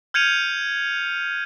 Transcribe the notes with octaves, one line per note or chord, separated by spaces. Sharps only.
F6 G6 G#6 C#7 D#7 F7